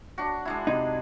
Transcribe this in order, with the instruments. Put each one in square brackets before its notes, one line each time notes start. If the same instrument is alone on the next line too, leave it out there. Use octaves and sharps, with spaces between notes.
[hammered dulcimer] D4 F#4
G#3 D4 E4
[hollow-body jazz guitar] C3 D#4